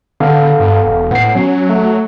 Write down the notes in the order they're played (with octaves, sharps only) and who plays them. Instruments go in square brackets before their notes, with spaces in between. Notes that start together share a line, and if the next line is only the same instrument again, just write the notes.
[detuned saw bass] D3 [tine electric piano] B3 A4 F5
[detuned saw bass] G2
E1
[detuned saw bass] A2 [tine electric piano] B3 C7
[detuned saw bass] F#3 [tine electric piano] C#4
[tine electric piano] A3